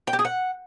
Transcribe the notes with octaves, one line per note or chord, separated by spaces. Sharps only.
G5
G4
G#4
F#5